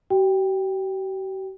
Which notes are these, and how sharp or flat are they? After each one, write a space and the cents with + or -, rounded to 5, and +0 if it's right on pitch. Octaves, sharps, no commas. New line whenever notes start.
G4 -45 G5 +15